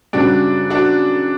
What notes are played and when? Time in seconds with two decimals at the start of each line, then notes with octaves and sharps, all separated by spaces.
0.13 F#2 C#3 G3 D4 F#4
0.70 D4 F#4